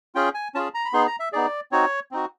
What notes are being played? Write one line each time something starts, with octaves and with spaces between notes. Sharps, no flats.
C#4 F4 G#4 G5
G#5
C#4 F4 G#4 A5
A#5
B5
B3 D#4 G#4 C6
A#5
E5
B3 D#4 G#4 D5
C4 D#4 F#4 C#5
C4 D#4 F#4